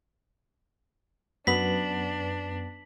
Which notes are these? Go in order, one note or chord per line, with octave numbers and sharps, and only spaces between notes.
F#2 B3 D4 B6 F#7